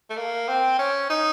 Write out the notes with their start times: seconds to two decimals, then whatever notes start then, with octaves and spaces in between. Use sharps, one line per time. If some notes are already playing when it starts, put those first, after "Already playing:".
0.10 A3
0.17 A#3
0.48 C4
0.79 C#4
1.10 D#4